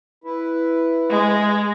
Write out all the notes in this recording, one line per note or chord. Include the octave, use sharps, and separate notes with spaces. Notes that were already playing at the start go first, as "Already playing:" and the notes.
E4 B4
G#3